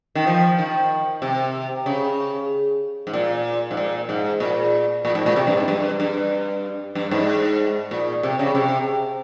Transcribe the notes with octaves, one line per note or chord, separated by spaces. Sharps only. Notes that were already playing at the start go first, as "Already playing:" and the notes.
D#3
F3
D#3
C3
C#3
G#2
A#2
G#2
A#2
G#2
A#2
A#2
G#2
A#2
C3
G2
G#2
G2
G2
G2
G#2
A#2
C3
C#3
C3